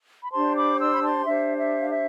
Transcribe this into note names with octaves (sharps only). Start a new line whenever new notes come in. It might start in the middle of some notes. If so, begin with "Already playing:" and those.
B5
D4 G4 C5 A5 C6
B5 D6
C6 E6
B5
A5 C6
D4 G4 C5 E5
E5
F5
E5